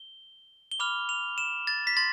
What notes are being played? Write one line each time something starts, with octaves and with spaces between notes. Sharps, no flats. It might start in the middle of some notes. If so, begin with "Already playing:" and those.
Already playing: G7
G7
B5 D6 F6 F7
F7
E7
A6
B6
C6 A6